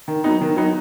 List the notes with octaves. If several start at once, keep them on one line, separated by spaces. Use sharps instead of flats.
D#3
F#3 B3 D#4
D#3
F#3 B3 D#4